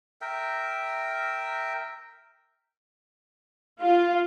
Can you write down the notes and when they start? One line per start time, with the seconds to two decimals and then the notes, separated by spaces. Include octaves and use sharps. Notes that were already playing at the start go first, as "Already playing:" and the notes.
0.21 A#4 E5 G5
3.80 F4 F5